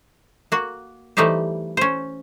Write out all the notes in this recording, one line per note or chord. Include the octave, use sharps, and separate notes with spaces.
A#3 F#4
E3 G3 A3 D#4 G4 C5
C#4 C5